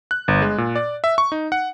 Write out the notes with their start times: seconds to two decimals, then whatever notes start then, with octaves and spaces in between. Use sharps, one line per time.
0.11 F#6
0.28 G1
0.42 G#3
0.58 A#2
0.76 D5
1.04 E5
1.18 C#6
1.32 D#4
1.52 F#5